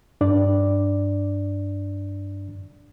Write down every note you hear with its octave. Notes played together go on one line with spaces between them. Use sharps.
G2 D4 D5